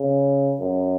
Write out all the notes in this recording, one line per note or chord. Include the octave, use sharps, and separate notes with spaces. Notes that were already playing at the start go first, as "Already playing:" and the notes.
Already playing: C#3
F#2